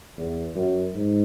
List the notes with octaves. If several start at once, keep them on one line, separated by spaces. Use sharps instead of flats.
E2
F#2
G#2